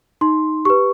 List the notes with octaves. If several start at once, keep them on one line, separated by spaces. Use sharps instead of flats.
D#4 C6
G4 B4 C#6